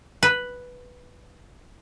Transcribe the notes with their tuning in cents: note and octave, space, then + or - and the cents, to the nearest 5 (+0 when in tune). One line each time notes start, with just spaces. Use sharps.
B4 +0